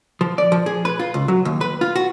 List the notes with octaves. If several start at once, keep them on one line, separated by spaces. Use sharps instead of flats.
F3
D5
F3
G#4
B4
F4
C#2
F#3
D#2
B4
F4
F#4